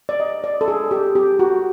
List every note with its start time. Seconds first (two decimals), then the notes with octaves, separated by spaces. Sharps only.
0.09 D5
0.20 D#5
0.44 D5
0.61 A4
0.68 G#4
0.91 G4
1.15 G4
1.39 F#4